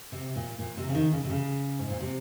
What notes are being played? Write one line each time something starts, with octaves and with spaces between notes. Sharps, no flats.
C3
A#2
A#2
C3
C#3
D#3
C#3
C3
C#3
G#2
A#2
C3